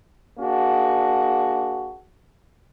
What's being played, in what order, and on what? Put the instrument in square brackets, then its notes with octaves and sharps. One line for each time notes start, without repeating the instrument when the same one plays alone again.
[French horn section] A#3 D4 F#4 G#4